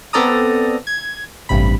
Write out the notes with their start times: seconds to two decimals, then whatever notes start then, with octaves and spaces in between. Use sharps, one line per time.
0.13 B3 C4 A4 D5 A#5 D#6
0.87 G#6
1.49 A1 G2 C3 B5